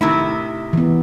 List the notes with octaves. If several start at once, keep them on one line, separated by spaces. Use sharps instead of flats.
C3 D#3 A3 E4
E3 B3